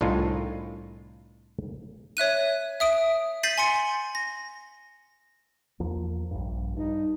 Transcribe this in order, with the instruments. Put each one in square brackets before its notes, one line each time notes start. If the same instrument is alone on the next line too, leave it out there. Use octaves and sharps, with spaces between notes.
[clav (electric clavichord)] C2 A2 D4 D#4 F4 G#5
[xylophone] C#5 E5 F#6 D#7
E5 D#6 D7
G6 A6 B6 C7 D#7 F#7
G#5 C6 C#7
A#6
[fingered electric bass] E2 F3 A#3
A#1 G2
[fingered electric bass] G2 [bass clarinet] D#4